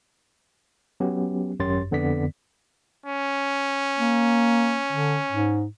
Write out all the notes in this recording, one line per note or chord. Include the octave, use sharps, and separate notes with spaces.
F#3 B3 C#4 G4
G#1 F#2 G4 C#5 C6 A6
F2 D3 B3 D5 B6
C#4
A#3
D3
G#2